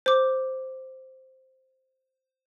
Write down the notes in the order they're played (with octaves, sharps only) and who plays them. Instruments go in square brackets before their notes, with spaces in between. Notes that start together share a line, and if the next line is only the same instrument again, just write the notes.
[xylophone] C5 D6